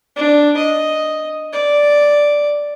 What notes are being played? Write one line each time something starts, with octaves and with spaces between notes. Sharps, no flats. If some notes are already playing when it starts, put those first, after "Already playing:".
D4
D#5
D5